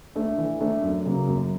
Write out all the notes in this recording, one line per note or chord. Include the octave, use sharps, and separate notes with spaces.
A3 D4
E3
A3 D4
F#2
C#3 F#3 A#3
F#2